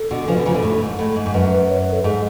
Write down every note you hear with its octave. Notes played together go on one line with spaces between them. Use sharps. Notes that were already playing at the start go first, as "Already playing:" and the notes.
Already playing: A4
B2 D3
C#3 F3 B4
B2 D3
C#3 F3
B2 D3
A2
G#2
A2
G#2
G#2
F#2 B4
C#5
B4
A4
G#2 G#4